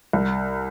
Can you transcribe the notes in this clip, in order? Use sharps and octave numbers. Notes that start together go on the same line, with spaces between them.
C2